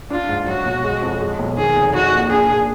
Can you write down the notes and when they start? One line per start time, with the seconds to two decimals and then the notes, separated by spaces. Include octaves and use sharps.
0.10 D4 F4
0.29 G#2
0.47 F#3 F#4
0.66 B1
0.84 G#3
1.02 F2
1.20 G#3
1.39 B1
1.57 D#3 G#4
1.76 F1
1.94 D#4 F#4
2.12 A#2
2.30 D4 G#4
2.49 A#2